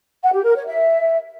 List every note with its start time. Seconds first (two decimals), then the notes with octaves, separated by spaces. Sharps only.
0.22 F#5
0.33 G4
0.44 A#4
0.55 C#5
0.66 E5